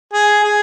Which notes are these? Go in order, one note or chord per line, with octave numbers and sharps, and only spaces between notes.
G#4
G#4